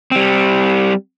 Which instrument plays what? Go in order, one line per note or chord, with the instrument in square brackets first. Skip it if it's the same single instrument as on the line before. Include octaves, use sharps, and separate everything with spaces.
[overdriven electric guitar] G3 C4